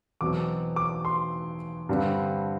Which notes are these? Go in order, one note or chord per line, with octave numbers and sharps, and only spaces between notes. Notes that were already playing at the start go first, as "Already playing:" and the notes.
E2 B2 F#3 C4 D6
D6
C6
G2 D3 G3 C4